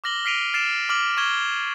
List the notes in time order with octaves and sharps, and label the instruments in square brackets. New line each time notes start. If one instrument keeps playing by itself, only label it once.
[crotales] D6 F6 A#6 F#7 G7
F6 B6 C7 D7 D#7 F7
F6 A6 C7 D7 E7
D6 F6 F#7
C#6 F6 G#6 E7 G7